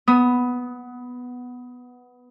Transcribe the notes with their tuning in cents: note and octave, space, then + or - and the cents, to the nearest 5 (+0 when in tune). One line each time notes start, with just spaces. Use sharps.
B3 +0 D#6 +20